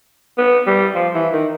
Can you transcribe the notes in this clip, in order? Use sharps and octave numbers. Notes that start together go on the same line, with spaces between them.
B3
G3
F3
E3
D#3